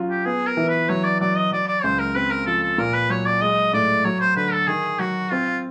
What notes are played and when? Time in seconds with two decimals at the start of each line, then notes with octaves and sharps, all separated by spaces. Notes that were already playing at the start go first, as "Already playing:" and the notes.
Already playing: F#3 C#4 F4
0.09 G4
0.25 B3 G#4
0.47 A#4
0.57 E3
0.68 B4
0.89 F#3 C#5
1.04 D5
1.20 F#3 D5
1.37 D#5
1.52 F#3 D5
1.68 D5
1.83 C#2 C5
1.99 A#4
2.15 C4 B4
2.31 A#4
2.46 F3 A4
2.63 A4
2.78 A#2 A#4
2.94 B4
3.10 F#3 C#5
3.26 D5
3.41 G#3 D#5
3.73 A2 D5
4.05 F#3 C#5
4.21 C5
4.36 D3 B4
4.52 A4
4.68 D#3 G#4
4.99 F#3 F#4
5.31 C4 F4